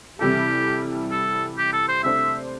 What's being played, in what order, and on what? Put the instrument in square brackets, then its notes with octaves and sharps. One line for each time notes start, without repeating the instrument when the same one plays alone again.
[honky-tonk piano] C3 E3 G3 E4 A4 [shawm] G4
[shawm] A4
G4
A4
C5
[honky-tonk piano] C3 A3 D4 C5 [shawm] E5